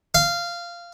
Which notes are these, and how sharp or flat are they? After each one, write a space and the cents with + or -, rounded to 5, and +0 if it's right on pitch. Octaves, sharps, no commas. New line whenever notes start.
F5 -15